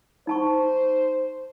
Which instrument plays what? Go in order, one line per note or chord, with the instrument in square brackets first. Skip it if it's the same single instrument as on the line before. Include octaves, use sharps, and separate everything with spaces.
[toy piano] D#4 A5 C#6 [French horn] C5